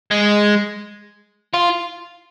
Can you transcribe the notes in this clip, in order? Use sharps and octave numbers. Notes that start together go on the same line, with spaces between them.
G#3
F4